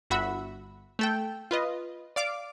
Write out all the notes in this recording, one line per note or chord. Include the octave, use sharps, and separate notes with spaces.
G1 F#4 E5 F#5 B5
A3 A4 G5
F4 B4 D#5
D5 F5 D6